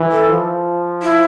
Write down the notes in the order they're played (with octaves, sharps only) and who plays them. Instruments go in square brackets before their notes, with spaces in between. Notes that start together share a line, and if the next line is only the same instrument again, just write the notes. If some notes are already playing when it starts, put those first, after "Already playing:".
Already playing: [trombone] E3
[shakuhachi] A4
[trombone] F3
[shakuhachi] E4